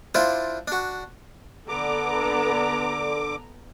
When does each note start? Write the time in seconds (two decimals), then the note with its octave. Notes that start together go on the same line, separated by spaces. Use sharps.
0.15 D4 E4 F4 C5 D5
0.68 D4 F#4
1.68 D3 B3 A4 A#5 D6